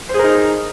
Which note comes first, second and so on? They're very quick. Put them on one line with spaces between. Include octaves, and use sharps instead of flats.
C5 G#4 A#4 D#4